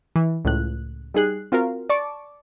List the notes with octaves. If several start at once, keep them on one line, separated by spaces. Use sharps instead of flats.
E3
C#2 A2 F#6
G3 D#4 G#4 F#6 C7
C4 F4 F#4 A#4 F5
D5 A5 C#6 D6